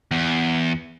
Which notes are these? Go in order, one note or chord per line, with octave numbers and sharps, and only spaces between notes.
E2